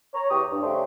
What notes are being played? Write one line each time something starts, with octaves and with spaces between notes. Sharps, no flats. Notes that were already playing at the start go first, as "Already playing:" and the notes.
C#5 A#5
E2 G4 C#6 D#6
G2
C#3 A3 D4 G4 C5 C6